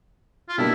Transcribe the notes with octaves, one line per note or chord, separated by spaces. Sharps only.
F4
B2 G3 A#3 D4 E4